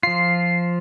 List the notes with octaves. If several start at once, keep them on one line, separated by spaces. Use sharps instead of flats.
F3 F4 C7